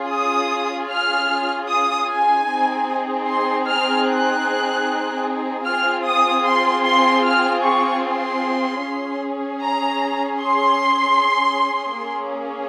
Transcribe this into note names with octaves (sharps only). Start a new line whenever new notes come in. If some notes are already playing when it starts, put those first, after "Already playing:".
Already playing: C#4 F4 G#4
D#6
F6
D#6
G#5
C4 D#4 G#4
C6
F6
F#6
C4 F4 G#4 F6
D#6
C6
C6
F6
C#6
C6
C#4 G#4
A#5
C6
A#3 C#4 G#4